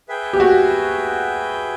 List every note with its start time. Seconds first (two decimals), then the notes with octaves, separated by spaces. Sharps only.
0.09 G#4 B4 E5 G5
0.33 G4
0.40 F#4